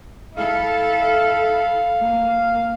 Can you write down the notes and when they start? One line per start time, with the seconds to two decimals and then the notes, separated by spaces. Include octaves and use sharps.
0.37 E4 A4 F5
2.01 A#3